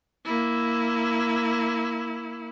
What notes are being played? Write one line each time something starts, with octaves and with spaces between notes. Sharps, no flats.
A#3 E4